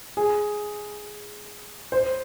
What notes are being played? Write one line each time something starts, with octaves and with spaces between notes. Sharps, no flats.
G#4
C5